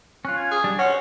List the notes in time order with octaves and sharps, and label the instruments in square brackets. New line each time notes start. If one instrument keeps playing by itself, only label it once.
[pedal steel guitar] C#4 F4 [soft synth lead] F#6
[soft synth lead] G#6
[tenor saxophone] G#4
[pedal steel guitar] G3 D4
[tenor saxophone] C#4 [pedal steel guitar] F#4 C5 [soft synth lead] F#5